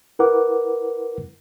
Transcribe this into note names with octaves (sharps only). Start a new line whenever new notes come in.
E4 A#4 B4 F#5 D6